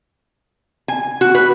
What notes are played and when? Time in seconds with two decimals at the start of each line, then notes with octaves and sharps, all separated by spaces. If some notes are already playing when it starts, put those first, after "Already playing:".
0.88 G#5
1.21 F#4
1.35 B4